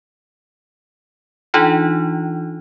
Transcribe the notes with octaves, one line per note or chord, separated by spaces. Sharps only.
E3 D4 D#4 F4